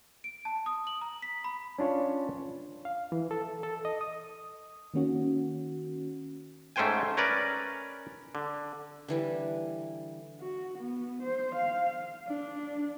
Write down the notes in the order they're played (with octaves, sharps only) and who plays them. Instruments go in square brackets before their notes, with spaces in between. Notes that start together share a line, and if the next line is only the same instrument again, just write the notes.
[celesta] D7
A5
D#6
F#7
A#5
B6
B5
[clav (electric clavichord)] C#4 D4 F4 C#5
[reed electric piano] F5
E3
A4
A4
D#5
D#6
[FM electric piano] D#3 A#3 C#4 F#4
[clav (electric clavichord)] G#2 A3 C#4 C5 G5 G#5
C#4 A#4 B4 D5
D3
[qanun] D3 E3 G3
[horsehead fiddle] F#4
B3
C5
F5
D4